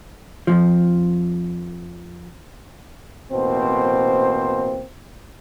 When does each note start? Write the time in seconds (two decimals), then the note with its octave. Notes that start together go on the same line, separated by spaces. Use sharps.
0.47 F2 G#2 F3
3.32 A1 B2 A#3 C4 C5